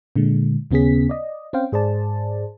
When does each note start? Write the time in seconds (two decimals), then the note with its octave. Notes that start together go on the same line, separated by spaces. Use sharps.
0.16 A#2 D3 G#3
0.71 D#2 C#3 B3 C#4 G#4 B6
1.09 D5 D#5
1.53 C4 C#4 C5 F5 G5
1.72 G#2 G#4 C5 D5 A5